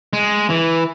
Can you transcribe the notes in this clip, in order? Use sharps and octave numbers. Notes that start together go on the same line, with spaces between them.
G#3
E3